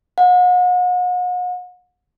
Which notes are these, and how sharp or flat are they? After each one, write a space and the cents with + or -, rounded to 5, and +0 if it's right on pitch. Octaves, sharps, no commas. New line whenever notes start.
F#5 -40